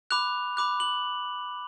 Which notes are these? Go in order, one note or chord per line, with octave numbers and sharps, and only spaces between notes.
B5 D6 F#6 F7
B5 D6 F#6
F#7